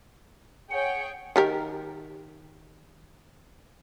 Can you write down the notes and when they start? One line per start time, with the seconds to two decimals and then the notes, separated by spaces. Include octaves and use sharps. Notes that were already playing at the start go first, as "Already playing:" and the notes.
0.71 G#4 C#5 F#5 G5
1.36 D#3 G4 A#4